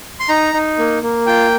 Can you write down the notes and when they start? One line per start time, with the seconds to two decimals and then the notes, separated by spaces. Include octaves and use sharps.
0.20 C6
0.29 D#4 A#5
0.54 D#4
0.79 A#3
1.03 A#3
1.26 F4 G5